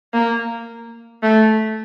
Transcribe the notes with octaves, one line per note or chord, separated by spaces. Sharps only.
A#3
A3